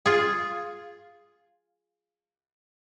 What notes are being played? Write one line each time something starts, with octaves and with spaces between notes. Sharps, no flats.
F4 G#4